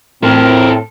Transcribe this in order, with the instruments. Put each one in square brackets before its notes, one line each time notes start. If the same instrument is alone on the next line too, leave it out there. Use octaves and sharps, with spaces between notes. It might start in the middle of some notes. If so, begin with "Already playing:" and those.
[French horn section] A2 [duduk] C4 [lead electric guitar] A4 C5 [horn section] A#4